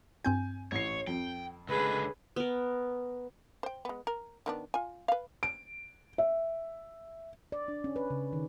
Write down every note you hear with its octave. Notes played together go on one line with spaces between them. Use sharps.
G2 C4 G#5 G6
A1 C#5 C7
F2 G5
C#2 D3 G#4 B4
B3 A#4
C5 G5
G#3 B3
A#4
D#3 B3 D4
F4 G#5
B4 F5
D7
E5
D5
D4
C#4
B4
C#3
D#3